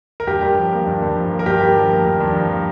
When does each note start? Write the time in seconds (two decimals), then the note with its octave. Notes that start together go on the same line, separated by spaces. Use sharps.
0.20 A#4
0.27 G2 G4
0.42 G2
0.58 F3
0.73 A#3
0.87 G2
1.02 G2
1.16 F3
1.31 A#3
1.39 A#4
1.46 G2 G4
1.62 G2
1.77 F3
1.90 A#3
2.05 G2
2.20 G2
2.36 F3
2.50 A#3